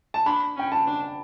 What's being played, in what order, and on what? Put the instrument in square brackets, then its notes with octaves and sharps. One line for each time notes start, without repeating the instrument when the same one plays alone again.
[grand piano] A5
[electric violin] D4 [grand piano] B5
[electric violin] C#4 [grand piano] G5
[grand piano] A5
[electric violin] D4